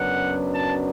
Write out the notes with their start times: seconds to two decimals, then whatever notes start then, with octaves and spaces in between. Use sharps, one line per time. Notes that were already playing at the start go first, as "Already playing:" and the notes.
Already playing: F#2 C#3 F#3 B3 D4 F#5
0.52 A5